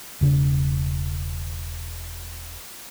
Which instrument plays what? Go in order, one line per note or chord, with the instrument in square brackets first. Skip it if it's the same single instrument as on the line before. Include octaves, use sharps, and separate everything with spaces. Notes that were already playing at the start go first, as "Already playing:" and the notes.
[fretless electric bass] E1 C#3 D4